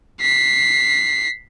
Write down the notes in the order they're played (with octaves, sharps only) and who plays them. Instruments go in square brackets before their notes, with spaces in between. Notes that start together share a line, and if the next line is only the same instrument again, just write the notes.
[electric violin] B6 C7